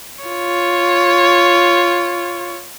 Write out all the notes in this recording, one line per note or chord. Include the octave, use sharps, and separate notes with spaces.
F4 C#5